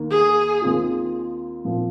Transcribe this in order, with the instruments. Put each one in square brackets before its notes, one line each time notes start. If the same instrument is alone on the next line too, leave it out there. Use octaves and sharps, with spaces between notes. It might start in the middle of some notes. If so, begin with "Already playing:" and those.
Already playing: [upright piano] D#2 D#3 A#3
[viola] G#4
[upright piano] D#2 D#3 C4 F4
A#2 F3 C4